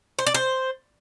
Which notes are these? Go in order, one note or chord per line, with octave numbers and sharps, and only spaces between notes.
C5
D5
C5